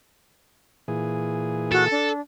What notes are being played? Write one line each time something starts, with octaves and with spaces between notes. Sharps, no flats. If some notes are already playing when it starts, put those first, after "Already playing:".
A#2 E3 G#4
F#4 A4
D4